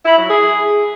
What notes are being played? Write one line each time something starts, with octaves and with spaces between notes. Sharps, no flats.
E4
F#3
G#4